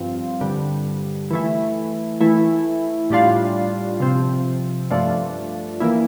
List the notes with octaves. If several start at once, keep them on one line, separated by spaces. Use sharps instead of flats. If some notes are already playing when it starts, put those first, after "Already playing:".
Already playing: G2 F3 C4 F4
G2 D3 G3
E3 A3 E4
E3 A3 E4
A2 G3 D4 F4
C3 F3 C4
G2 F3 A3 D4 F4
E3 A#3 E4